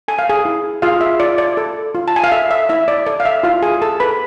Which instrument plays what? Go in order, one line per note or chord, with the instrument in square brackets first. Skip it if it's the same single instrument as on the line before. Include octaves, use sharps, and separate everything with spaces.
[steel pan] A4 G#5
F5
G#4 G#5
E4
F4 G#4 F5
E5
F4 D5
D5
A4
F4
A5
G#5
F5
A4 E5
E5
E4 E5
D5
A4 D5
F5
E5
E4 F4 F5
G#4 G#5
A4 A5
B4 B5